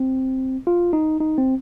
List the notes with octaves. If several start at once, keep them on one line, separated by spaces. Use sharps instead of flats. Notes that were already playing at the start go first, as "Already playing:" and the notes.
Already playing: C4
F4
D#4
D#4
C4